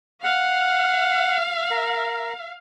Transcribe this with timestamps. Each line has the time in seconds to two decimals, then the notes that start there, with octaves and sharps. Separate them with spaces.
0.24 F5 F#5
1.71 A#4